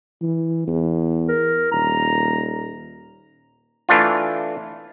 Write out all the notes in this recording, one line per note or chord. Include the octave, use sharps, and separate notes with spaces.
E3
E2
A#4
D#1 A#5
E3 A3 D4 F4